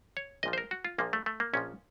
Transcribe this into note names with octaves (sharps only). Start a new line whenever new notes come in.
C#5
A#1 A#2 F3 D#5
C5
A#4
F#4
F4
A#1 A#2 F3 A#3
A3
A3
A#3
A#1 A#2 F3 C#4